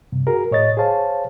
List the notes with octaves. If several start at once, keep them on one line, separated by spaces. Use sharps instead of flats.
G2 C3
F#4 G#4 A#4
A2 C#5 D#5 A6
G#4 C5 C#5 F5 A5